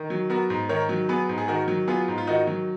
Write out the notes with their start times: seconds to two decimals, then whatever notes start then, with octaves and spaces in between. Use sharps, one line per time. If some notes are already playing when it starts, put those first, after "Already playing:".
Already playing: D#3
0.10 F#3
0.30 B3 F#4 A#4
0.50 G#2
0.69 D#3 A#4 C#5
0.89 F#3
1.09 B3 G#4 B4
1.29 G#2
1.38 G#4
1.48 D#3 F#4 A#4
1.68 F#3
1.88 B3 F4 G#4
2.08 G#2
2.18 F4
2.27 D#3 D#4 F#4
2.47 F#3